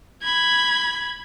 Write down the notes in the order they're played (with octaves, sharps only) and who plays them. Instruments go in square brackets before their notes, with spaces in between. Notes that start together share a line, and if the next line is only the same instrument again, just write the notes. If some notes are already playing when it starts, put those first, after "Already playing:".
[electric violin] B5 G#6